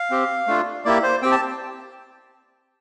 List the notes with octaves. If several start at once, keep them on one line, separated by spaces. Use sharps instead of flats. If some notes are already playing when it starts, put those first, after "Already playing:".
Already playing: F5
C4 G4
A3 D4 F4
A#3 E4 G4 D5
C5
C4 G4 G5
A5